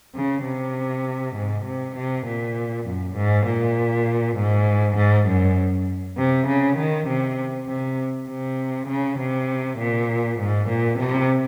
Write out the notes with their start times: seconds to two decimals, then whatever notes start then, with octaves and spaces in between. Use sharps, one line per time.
0.15 C#3
0.44 C3
1.36 G#2
1.65 C3
1.96 C3
2.26 A#2
2.86 F#2
3.17 G#2
3.47 A#2
4.37 G#2
4.97 G#2
5.27 F#2
6.17 C3
6.47 C#3
6.77 D#3
7.07 C3
7.68 C3
8.29 C3
8.88 C#3
9.19 C3
9.78 A#2
10.39 G#2
10.68 A#2
10.99 C3